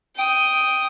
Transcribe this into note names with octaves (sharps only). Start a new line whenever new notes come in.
G5 D#6